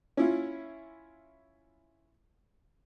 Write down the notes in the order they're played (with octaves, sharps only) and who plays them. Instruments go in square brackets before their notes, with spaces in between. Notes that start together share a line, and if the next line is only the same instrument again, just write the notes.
[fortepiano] C#4 E4 F4